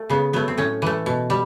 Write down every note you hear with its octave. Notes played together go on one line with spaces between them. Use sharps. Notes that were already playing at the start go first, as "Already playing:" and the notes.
Already playing: A3
C#3 B3
F#3 A3 B3
C4
A2 C#4
E3 A3
B2
G3